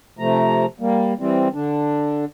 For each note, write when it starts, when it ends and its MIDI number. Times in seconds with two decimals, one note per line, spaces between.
0.19 0.66 48
0.19 0.66 53
0.19 0.66 57
0.19 0.66 82
0.80 1.13 55
0.80 1.13 58
1.19 1.48 52
1.19 1.48 55
1.19 1.48 60
1.53 2.25 50
1.53 2.25 62